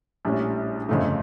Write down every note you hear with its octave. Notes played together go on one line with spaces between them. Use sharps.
A#1 A2 G3 C#4
G1 F2 C#3 F3 A3